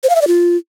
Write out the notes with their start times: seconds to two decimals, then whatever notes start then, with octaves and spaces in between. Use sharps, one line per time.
0.03 C5
0.09 F5
0.15 E5
0.21 D5
0.28 F4